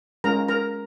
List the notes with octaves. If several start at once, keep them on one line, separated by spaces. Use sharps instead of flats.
G#3 C#4 F4 A#4 A#5
A#4 A#5